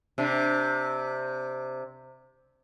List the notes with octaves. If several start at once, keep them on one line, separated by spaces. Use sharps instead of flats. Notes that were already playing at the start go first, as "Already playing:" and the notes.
C3 D4